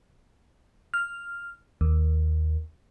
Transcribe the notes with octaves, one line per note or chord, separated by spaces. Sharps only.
F6
D#2